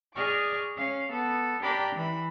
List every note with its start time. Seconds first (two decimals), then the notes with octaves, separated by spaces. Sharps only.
0.15 G#4 D5 D#5 C#6 D6 F6
0.76 C#4 F5
1.10 B3 A4
1.62 D4 G4 A#4 D5 G5 B5
1.95 E3 B5